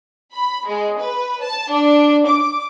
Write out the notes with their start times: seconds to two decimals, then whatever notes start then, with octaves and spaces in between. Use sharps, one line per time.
0.34 B5
0.67 G#3
1.00 B4
1.42 A5
1.71 D4
2.27 D6